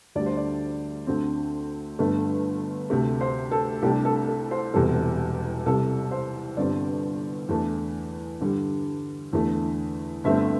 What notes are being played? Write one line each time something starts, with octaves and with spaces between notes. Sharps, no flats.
D2 D3 G3 D5
C5
D5
D2 D3 C4
G1 G2 D3 A3
D2 C3 A3
C5
A4
C2 C3 A3 D4 G4
A4
A4
C5
E1 E2 C3 G3 A4
C2 C3 G3 A4
C5
G1 G2 D3 G3 C4 D5
E2 E3 A3 D4
G2 D3 G3
E2 D3 A3
G1 G2 D3 A3 C4 E5